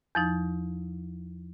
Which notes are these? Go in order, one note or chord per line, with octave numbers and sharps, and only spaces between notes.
E2 F3 D#4